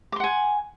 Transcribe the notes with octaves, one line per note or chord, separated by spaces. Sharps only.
F#5 G#5 C6 D6